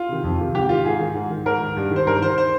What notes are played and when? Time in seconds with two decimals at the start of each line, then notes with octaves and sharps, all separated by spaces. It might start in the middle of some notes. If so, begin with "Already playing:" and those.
Already playing: F4
0.09 C3 D#3
0.24 F2
0.39 C3 D#3
0.55 G#2 G4
0.69 D#3 F4
0.85 G#2 G#4
1.00 D#3
1.15 G#2
1.30 D#3
1.45 G#2 A#4
1.61 D#3
1.77 G2
1.91 D#3 C5
2.07 G2 A#4
2.22 D#3 C5
2.38 C5